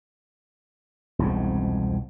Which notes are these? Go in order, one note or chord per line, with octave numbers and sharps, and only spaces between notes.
E1 C2 F2 G#2